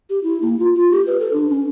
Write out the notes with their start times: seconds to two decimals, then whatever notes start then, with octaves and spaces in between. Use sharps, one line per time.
0.10 G4
0.24 E4
0.42 A#3
0.59 F4
0.75 F4
0.91 G4
1.07 B4
1.20 A4
1.33 D4
1.50 C#4